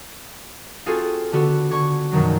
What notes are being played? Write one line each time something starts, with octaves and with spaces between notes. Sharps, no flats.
C4 F4 F#4 G#4 A4
D3 B3 F#4 A4
D3 C#6 G#6
A#1 F#2 B2 D#3 F#3